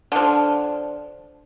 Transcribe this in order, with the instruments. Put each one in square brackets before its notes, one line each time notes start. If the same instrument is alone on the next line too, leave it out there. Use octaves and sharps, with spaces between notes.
[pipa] D3 F3